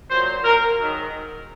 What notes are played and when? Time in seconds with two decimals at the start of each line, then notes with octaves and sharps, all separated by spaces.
0.11 A#2 F#3 C5
0.45 A#4
0.79 G#2 D#3 F#3